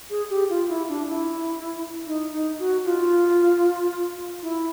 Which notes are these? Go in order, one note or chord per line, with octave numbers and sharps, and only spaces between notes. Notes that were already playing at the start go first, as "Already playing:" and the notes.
G#4
G4
F4
E4
D4
E4
D#4
D#4
F#4
F4
E4